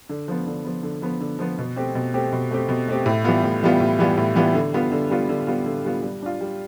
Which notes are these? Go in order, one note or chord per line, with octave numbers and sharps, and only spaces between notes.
D3
F3 B3
D3
F3 B3
D3
F3 B3
D3
F3 B3
B2
A3 C4 G4
B2
A3 C4 G4
B2
A3 C4 G4
B2
A3 C4 G4
A2
E3 G3 B3 F4
A2
E3 G3 B3 F4
A2
E3 G3 B3 F4
A2
E3 G3 B3 F4
D3
G3 B3 F4
D3
G3 B3 F4
D3
G3 B3 F4
D3
G3 B3 F4
G3
D4 F4
G3